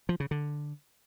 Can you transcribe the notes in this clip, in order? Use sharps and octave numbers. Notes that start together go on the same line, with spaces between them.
F3
C#3
D3